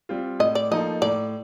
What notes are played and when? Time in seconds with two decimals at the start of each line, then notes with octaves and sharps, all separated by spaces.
0.09 G3 C4 F4
0.39 A2 D#5
0.55 D5
0.71 F3 A#3 D#4 A4 D#5
1.02 A2 D5